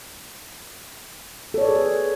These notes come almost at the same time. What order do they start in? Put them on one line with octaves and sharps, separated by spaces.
A4 C#5 D5 B4 G#4